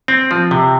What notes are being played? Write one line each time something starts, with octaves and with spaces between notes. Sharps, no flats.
C4
F3
C3